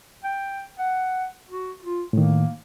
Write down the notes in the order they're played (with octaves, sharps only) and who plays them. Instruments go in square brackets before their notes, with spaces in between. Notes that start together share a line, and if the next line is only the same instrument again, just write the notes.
[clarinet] G5
F#5
F#4
F4
[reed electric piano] A2 D#3 [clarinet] A#3